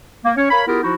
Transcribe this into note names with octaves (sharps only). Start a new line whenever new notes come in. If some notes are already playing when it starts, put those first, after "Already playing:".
A#3
C#4 C#5
A#4 C#5 F5 B5
B3 E4 F4 G4 G#4 A#4
F3 D#4 E4 F#4